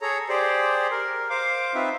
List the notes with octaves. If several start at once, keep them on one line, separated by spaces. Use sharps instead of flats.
G#4 A4 C#5 A#5
G4 G#4 C5 D5
A#4
C5 F5 D6
C4 D#4 F4 B4 E5